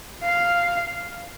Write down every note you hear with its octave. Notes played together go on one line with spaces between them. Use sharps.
F5